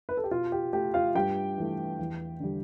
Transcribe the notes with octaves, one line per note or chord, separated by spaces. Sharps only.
B4
A4
G4
B2 F4
G4
A3 G4
F4 F5
G2 G4 G5
E3 A3
E2
D3 G3